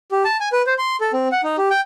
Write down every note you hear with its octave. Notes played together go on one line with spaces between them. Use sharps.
G4
A5
G#5
B4
C5
C6
A4
C4
F#5
D#4
G4
G5